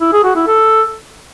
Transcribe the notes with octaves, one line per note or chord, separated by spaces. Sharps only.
E4
G#4
F#4
E4
A4